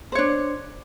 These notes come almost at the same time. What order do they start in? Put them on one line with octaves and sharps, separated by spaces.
C5 C#5 D4